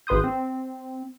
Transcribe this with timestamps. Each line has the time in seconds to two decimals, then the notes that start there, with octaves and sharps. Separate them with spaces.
0.07 G#1 B4 C6 D#6 G6
0.24 C4